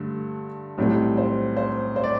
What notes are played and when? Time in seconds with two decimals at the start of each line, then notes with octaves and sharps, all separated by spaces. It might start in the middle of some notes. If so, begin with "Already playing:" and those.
Already playing: G2 D3 A3
0.78 B1 A2 G3 C4
1.17 C5
1.57 C5
1.96 C5
2.04 D5